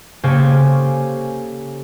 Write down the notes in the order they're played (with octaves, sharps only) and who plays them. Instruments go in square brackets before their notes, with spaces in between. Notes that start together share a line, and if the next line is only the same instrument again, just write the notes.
[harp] C#3 A#3 G4 A4 C5 G#5